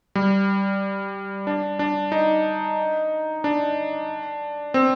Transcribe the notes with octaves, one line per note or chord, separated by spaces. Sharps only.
G3
D4
D4
D#4
D4
C4